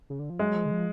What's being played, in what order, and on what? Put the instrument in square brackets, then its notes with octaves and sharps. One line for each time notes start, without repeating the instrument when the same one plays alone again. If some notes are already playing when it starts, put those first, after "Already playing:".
[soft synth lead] C#3
D3
F3
[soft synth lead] F#3 [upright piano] G#3
[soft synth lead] F#3
F3
D3
F3